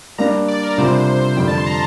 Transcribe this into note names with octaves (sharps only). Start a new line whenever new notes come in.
G3 A#3 D4 A#5
D5
A#4
C3 G3 D4 F4 A#4 C5
F2 D3 G3 G5
A5
C6
A#5